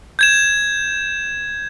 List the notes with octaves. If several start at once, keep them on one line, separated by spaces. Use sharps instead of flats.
G6 G#6 E7